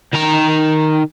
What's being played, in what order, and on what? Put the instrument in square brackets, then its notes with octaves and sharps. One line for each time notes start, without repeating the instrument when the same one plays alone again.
[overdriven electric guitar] D#3 A#5